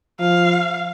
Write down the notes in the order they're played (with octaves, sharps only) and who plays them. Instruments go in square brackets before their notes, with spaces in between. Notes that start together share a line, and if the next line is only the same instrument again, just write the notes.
[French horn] F3 [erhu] F5